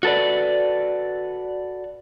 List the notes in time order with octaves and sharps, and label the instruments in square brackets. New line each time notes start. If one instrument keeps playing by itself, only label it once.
[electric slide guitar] F#4 A4 B4 D5